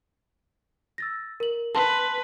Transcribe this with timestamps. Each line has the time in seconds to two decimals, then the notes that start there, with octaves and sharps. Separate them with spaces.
0.98 E6 A6 A#6
1.40 A#4 F#7
1.75 B4 A5 C6